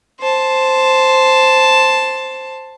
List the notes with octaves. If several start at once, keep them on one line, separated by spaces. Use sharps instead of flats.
C5 A5